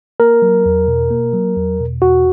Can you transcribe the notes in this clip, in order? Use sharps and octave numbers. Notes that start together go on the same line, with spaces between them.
A#3 A#4
F#3
E2
B2
A#3
F#3
E2
B2
E2 F#4